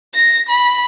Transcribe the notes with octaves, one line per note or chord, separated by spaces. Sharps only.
A#6
B5